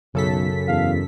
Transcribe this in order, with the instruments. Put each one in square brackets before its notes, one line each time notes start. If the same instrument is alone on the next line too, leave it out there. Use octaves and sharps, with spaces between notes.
[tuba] B1 [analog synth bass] F#2 [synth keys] C#3 A4 B6
[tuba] E2 [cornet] F5